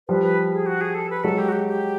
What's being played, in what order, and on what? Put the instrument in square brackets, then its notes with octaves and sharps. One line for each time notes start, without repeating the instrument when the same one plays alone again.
[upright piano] F3 G3 [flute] B4
[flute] B4
G#4
F#4
G#4
A4
B4
[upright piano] F#3 G#3 [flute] A4
[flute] G4
F#4
G4
G4